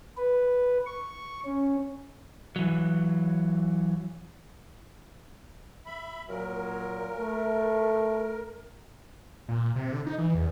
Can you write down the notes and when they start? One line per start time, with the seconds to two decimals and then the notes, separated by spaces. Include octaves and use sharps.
0.17 B4
0.86 C#6
1.45 C#4
2.56 E3 F#3
5.86 E5 B5
6.29 A#2 F#3 A#4
7.18 A3
9.48 A#2
9.76 C3
9.93 D3
10.06 D#4
10.18 E3
10.35 E2